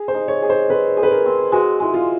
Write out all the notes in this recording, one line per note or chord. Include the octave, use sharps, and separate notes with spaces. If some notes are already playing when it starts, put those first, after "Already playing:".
Already playing: G#4
C5
D#4
C#5
G#4
C5
C4 B4
G#4
B4
A#4
C4
G#3 F#4
G#3 E4
F4